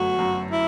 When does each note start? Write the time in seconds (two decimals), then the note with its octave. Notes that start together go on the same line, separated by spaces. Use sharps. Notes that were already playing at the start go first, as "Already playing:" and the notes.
Already playing: G1 F#2 A3 F#4
0.19 F#2
0.51 E4